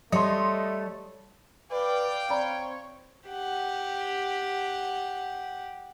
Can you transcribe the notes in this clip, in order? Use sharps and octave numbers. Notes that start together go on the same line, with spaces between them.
G3 A3 C#5 D#5 C6
B4 D5 F5 G5
C4 C#5 D5 A#5 B5
G4 F#5